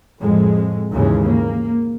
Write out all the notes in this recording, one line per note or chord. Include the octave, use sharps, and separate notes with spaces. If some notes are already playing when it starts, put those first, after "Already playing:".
F2 A2 G#3
D#2 G#2 C#3 E3 G#3
A#3